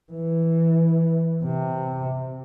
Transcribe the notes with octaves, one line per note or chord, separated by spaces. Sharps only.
E3
C3